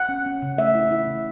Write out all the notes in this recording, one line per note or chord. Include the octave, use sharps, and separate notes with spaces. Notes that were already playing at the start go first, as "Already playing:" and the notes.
Already playing: F#5
C#4
C#4
C#3
A3 E5
E4
E4
C#3